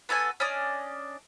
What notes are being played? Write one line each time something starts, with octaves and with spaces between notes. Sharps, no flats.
B3 F#4 A4 G#5
C#4 D4 D5 D#5